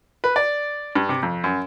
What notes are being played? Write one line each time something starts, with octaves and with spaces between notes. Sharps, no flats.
B4
D5
G2
C3
F2
F#2